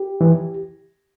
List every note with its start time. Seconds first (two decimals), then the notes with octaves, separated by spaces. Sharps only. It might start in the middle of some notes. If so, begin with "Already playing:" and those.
Already playing: G4
0.21 E3